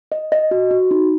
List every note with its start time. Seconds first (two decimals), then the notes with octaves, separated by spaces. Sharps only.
0.12 D#5
0.32 D#5
0.51 F#4
0.71 F#4
0.91 D#4